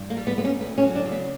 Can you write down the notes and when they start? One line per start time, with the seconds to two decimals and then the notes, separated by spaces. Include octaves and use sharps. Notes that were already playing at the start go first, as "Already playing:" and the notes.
Already playing: G2
0.10 A#3
0.17 G3
0.27 B3
0.38 A#3 B3
0.45 C#4
0.61 D2 B3
0.78 C#4
0.84 F#3
0.95 D4
1.06 C#3
1.12 B3